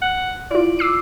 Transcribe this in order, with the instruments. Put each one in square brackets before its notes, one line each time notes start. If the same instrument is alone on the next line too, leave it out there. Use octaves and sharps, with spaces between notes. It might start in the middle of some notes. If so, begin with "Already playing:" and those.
[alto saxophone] F#5
[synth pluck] E4 F4 [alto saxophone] D5
[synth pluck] D6 E6 C7